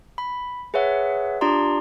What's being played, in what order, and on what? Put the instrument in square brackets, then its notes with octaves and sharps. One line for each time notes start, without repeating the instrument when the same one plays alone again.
[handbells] B5
G#4 B4 C#5 E5 F#5
D4 F4 G4 D5 A#5 C6